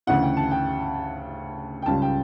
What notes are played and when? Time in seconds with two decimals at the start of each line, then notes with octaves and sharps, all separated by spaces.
0.07 D2 C#3 E3 F#5
0.22 G5
0.37 A5
0.51 G5
1.82 G5
1.86 C#2 C#3 G3 A5
2.02 G5